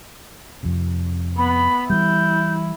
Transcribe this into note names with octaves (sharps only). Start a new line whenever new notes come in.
F2 C3
B3 B5
E3 G3 E4 G6